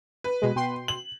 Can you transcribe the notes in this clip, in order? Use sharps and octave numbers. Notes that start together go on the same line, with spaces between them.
B4
B2 G#3
B2 G5 C6
F#7